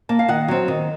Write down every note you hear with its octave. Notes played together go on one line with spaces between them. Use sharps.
A#3 A5
F5
D#3 F#5
F#3 C4
D#3